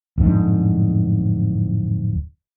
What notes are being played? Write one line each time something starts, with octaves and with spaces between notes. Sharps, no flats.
D1 F2 G#2 D4